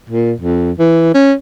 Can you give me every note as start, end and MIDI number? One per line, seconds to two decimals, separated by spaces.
0.09 0.33 46
0.40 0.71 41
0.79 1.10 52
1.14 1.33 61